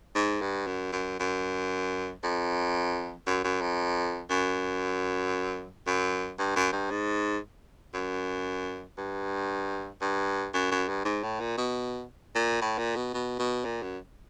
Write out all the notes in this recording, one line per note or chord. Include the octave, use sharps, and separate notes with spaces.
G#2
G2
F#2
F#2
F#2
F2
F#2
F#2
F2
F#2
F#2
G2
F#2
G2
G#2
F#2
G2
G2
F#2
F#2
G2
G#2
A2
A#2
B2
A#2
A2
A#2
B2
B2
B2
A#2
F#2